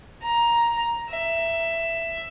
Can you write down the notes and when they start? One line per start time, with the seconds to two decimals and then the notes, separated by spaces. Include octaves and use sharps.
0.22 A#5
1.10 E5